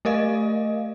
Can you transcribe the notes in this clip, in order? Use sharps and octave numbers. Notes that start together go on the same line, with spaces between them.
A3 A#4 D#5 F5